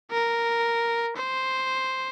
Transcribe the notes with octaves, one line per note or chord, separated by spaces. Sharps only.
A#4
C5